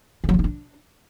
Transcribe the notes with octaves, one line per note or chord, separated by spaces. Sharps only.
D3
F#3
C#3
D#4
D4